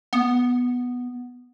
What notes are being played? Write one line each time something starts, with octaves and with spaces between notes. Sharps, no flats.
B3